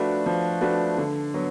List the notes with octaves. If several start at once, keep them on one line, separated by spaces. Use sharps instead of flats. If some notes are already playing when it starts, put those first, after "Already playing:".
Already playing: F3 A3 D4 F#4 B4
F3
A3 D4 F#4 B4
D3
F#3 B3